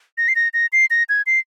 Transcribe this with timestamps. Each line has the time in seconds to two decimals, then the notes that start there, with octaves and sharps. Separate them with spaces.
0.18 A#6
0.28 C7
0.36 A#6
0.54 A#6
0.73 C7
0.91 A#6
1.09 G#6
1.27 C7